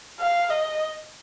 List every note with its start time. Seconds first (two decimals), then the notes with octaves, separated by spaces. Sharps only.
0.20 F5
0.50 D#5